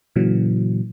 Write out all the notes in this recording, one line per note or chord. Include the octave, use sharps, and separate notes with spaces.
A#2 C#3 E3 F#3